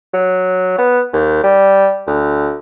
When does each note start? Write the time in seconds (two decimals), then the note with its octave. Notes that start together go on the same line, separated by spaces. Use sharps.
0.14 F#3
0.78 B3
1.13 D#2
1.44 G3
2.07 D2